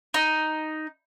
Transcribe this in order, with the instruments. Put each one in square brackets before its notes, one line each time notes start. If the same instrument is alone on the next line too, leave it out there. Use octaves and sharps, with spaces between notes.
[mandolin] D#4